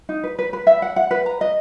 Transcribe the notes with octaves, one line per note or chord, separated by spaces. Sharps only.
D#4
B4
B4
B4
E5
F#5
F#5
B4
A#5
D#5